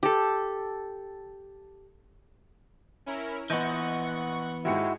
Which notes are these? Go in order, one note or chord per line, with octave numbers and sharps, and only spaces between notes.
G4 A4
C#4 E4 A#4
A#1 E3 B3 D#5 F#5 C#6 G6
D#2 G#2 G#3 E4 F#4 G4 C#7